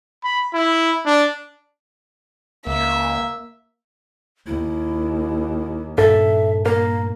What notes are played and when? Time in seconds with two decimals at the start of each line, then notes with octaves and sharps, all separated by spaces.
0.24 B5
0.54 E4
1.06 D4
2.67 C#2 A#3 E5
4.47 D#2 E4
5.98 G2 A#2 A4 E5
6.65 A#3 A#4